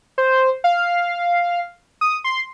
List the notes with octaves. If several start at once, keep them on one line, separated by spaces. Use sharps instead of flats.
C5
F5
D#6
C6